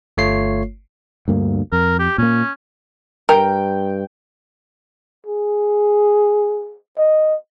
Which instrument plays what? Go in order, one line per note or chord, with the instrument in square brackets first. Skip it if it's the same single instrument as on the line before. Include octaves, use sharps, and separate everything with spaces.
[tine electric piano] G1 A3 F4 C#5 C7
[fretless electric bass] D2 G2 A#3
[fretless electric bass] F2 [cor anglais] A#4
[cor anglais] G4
[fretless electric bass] A#2 A#3 [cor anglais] C#4
[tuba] G2 [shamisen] A#4 [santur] G5
[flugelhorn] G#4
D#5